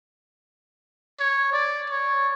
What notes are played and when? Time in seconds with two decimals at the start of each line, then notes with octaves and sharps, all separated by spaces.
1.20 C#5
1.53 D5
1.90 C#5